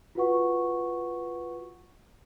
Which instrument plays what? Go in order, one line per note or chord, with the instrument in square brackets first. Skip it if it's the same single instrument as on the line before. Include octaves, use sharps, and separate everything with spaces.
[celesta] F4 F#4 B4 F#5 C#6